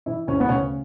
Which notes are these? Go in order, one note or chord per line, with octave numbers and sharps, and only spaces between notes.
E3 E4
D2 C#4
B3
C#3 C#4